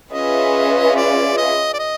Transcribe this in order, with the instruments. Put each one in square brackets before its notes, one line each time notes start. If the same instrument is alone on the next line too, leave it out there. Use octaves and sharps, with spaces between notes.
[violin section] C#4 F4 G#4 B4 E5 [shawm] D#5
[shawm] D5
D#5
D5
D#5